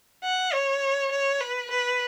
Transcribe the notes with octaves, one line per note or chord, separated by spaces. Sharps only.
F#5
C#5
C#5
B4
B4